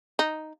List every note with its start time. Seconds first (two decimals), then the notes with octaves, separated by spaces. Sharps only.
0.19 D#4